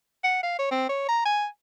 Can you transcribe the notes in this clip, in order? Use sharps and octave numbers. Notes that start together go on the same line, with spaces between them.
F#5
F5
C#5
C4
C#5
A#5
G#5